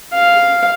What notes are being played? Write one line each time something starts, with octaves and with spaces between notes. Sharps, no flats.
F5